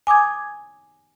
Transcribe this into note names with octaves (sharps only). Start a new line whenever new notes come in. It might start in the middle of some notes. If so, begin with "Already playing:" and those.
G#5 D6 D#6 G#6